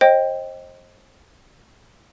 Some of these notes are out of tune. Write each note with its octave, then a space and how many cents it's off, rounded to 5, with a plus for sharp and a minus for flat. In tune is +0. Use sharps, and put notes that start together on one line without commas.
C5 +30 D#5 +0 G5 +0